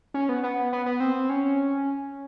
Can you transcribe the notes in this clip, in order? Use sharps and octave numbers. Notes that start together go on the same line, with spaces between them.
C#4
B3
B3
B3
B3
C4
C#4